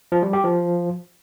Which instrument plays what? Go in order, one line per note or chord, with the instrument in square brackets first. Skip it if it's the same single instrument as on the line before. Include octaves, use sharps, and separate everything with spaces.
[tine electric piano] F3
G3
G4
F3